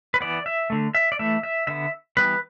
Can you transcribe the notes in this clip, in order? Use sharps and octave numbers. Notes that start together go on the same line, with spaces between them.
B4
E3 B3 D5
E5
D3 A3
E5
D5
E3 A3 E5
E5
D3 B3 E5
E3 G3 B3 B4